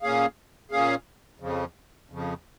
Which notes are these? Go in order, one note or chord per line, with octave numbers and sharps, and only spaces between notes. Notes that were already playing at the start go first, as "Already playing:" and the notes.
A#2 A#3 C#4 G#4 F5
A#2 A#3 C#4 G#4 F5
F2 C#3 F3
F2 C#3 F3